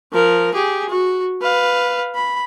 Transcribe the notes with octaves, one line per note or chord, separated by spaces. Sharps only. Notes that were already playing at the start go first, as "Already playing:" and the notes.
F3 A#4
G4 G#4
F#4
B4 F5
B5